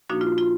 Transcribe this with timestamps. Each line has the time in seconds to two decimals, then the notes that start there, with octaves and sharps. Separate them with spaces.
0.10 A#2 F3 A#3 D4 D#4 F#4
0.21 F4
0.38 F4